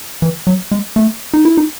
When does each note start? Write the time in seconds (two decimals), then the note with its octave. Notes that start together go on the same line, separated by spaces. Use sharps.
0.22 E3
0.47 F#3
0.71 G#3
0.96 A3
1.34 D#4
1.45 E4
1.57 D#4